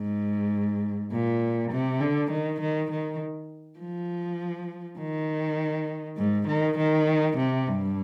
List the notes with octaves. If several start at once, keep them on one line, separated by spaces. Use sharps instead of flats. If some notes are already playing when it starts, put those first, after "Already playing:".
Already playing: G#2
A#2
C3
D3
D#3
D#3
D#3
F3
D#3
G#2
D#3
D#3
C3
G2